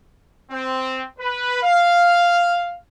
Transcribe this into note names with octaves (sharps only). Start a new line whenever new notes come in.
C4
B4
F5